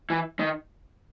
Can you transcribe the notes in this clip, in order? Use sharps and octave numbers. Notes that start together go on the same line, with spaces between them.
E3
D#3